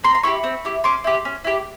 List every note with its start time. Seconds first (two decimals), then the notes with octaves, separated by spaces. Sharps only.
0.04 C4 A#5 C6
0.15 C6
0.23 E4 G4 B5 C#6
0.44 C4
0.65 E4 G4
0.84 C#4 C6 D6
1.04 E4 G4
1.25 C#4
1.44 E4 G4